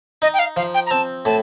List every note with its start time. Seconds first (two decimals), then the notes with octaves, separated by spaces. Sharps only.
0.22 D#4 D#5
0.33 G5
0.39 F5
0.56 F3 F5
0.74 G5
0.86 A#5
0.91 C4 A5
1.25 A2 A5